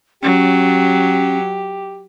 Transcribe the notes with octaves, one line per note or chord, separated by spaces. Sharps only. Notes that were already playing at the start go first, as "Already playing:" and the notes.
F#3 C#4 G4